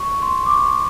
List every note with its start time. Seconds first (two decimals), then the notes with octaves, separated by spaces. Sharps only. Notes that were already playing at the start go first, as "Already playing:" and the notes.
Already playing: C#6
0.22 C6
0.46 D6
0.50 C#6